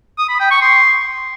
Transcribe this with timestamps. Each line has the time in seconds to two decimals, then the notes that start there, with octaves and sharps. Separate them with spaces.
0.18 D#6
0.29 B5
0.40 G5
0.51 C#6
0.62 C6